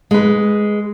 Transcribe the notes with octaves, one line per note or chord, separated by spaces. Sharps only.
G#3 B4